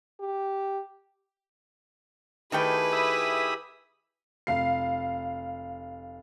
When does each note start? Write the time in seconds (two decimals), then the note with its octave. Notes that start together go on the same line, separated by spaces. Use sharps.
0.20 G4
2.52 D#3 A3 E4 G4 G#4 B4 G5
2.93 E5 B5 D#6
4.47 F1 F5 C7